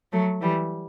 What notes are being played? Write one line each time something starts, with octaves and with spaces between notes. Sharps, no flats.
F#3 A3
E3 G3